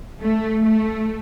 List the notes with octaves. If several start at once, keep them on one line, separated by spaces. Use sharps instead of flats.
A3
A3